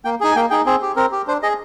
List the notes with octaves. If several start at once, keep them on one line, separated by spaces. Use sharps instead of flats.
A#3 G5
D#4 G#4 G#5
A#3 G5
D#4 G#4 G5
C4 G#4
G4
C4 A#4
G4
D4 C5
G#4 D#5